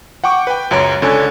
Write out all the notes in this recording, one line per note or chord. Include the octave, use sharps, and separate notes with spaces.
F#5 G5 C#6 D6
B4 G5
C#2 F#2 C#5 A#5 D7
C#2 D3 C#4 D4 A4 G#5